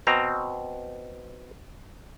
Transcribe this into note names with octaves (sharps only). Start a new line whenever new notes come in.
B2 C4 A#5